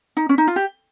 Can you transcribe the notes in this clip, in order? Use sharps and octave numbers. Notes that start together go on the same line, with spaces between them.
D#4
C#4
D#4
F4
G4